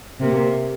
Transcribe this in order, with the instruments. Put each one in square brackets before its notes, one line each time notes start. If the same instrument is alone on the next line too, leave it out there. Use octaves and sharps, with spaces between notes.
[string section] C3 A#3